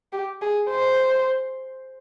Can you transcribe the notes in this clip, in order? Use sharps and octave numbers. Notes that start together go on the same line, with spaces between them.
G4
G#4
C5